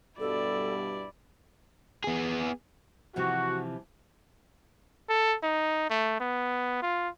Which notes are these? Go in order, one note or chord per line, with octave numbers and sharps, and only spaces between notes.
G2 B2 G3 E4 A4 D5
B3 G#4
C3 E3 F3 F#4
A4
D#4
A3
B3
F4